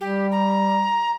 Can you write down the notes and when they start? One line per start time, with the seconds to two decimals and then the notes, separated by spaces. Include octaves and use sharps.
0.01 G3 G4
0.31 A#5